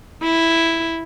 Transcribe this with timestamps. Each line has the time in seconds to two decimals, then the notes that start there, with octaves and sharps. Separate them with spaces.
0.23 E4